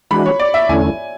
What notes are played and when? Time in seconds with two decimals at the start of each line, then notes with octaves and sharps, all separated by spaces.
0.11 E3 G#3 D4 F#4 B5
0.26 C#5
0.40 D5
0.54 E5
0.69 E2 D3 A3 C#4 E4 G#5